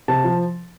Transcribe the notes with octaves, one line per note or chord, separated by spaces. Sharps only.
C3 A5
F3